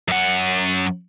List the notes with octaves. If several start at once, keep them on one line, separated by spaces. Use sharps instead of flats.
F#2 F#5